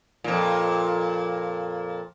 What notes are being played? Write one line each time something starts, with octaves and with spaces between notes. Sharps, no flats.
F2 A#2